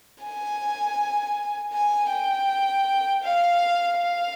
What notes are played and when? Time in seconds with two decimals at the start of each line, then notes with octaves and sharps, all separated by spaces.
0.24 G#5
1.73 G#5
2.11 G5
3.23 F5
3.98 F5